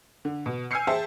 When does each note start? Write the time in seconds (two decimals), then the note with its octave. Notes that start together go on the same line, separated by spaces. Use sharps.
0.25 D3
0.46 B2
0.71 G#5 E6 F6 G6 C7 C#7
0.87 G#4 C5 E5 G5 A5